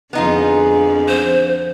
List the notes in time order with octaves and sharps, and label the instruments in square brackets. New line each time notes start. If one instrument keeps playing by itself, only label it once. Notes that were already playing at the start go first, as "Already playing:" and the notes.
[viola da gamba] F2 D3 [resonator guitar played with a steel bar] B3 D#4 F4 [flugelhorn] G#4
[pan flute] C5